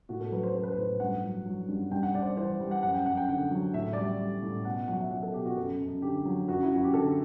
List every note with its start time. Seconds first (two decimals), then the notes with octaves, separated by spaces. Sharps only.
0.09 A2 F#4
0.20 A4
0.32 F#3 B4
0.43 C5
0.54 F#3 C5
0.63 B4
0.73 A2 C5
1.00 G2 F#5
1.23 F#3
1.46 F#3
1.68 G2
1.91 G2 G5
2.03 F#5
2.14 G2 D5
2.21 C5
2.26 D5
2.37 E3 C5
2.60 G3
2.71 F#5
2.83 F#2 F#5
2.94 G5
3.06 F#2 F#5
3.17 G5
3.28 D3 F#5
3.51 F#3
3.74 A2 E5
3.93 G3 D5
4.05 E5
4.19 G3
4.42 A2
4.65 B2 F#5
4.88 F#3 F#5
5.01 E5
5.11 F#3 F#5
5.23 A4
5.34 B2 G4
5.46 F#4
5.57 F#2 A4
5.79 F#2
6.02 D3 G4
6.25 F#3
6.48 F#2 F#4
6.63 E4
6.71 F#2 F#4
6.84 G4
6.94 D3 A4